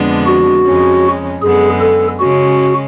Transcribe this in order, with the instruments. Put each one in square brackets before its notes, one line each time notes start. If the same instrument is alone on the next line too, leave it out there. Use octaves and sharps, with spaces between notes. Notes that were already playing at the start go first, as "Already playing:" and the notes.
Already playing: [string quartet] F2 D3 G#3 B3 D4
[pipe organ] F#4
[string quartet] F2 C#3 G#3 C#4
[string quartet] F#2 D3 G#3 B3 [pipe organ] G#4
[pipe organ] A4
[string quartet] C#3 G#3 C#4 [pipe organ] F#4